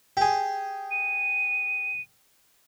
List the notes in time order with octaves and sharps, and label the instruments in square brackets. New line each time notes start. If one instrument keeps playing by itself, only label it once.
[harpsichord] G4 G#4
[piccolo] D#7